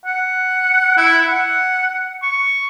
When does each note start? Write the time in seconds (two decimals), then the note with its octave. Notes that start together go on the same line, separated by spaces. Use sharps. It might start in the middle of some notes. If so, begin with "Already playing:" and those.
0.06 F#5
0.98 E4
1.28 F#5
2.23 C#6